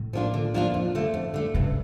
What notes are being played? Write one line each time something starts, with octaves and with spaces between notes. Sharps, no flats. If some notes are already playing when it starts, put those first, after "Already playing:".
Already playing: A2
F3 A#3 D4 F4
D3
F3 A#3 D4 F4
F2
D3 A3
F2
D3 A3
G2 C#3